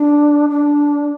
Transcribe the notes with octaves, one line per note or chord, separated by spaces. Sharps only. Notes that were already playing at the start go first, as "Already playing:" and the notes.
Already playing: D4
D4